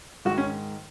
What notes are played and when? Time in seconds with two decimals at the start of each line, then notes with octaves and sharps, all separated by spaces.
0.25 G#2 D#3 F#4
0.38 C#4